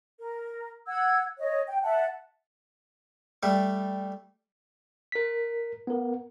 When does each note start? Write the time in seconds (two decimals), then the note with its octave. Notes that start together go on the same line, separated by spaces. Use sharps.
0.20 A#4
0.88 F#5 E6 G#6
1.39 C#5 D#5
1.68 G5
1.83 E5 F#5 A5
3.43 G3 A3 E5
5.12 A#4 B6
5.87 B3 A#4